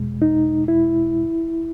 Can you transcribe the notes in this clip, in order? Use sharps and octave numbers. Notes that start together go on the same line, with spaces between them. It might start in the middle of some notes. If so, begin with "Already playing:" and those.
Already playing: E2 B2 G#3
D#4
E4